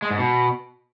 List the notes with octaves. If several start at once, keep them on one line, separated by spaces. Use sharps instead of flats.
G#3
G#2
B2